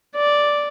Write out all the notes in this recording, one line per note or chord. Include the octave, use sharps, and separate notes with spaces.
D5